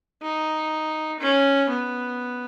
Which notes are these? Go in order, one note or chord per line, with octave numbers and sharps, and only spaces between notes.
D#4
C#4
B3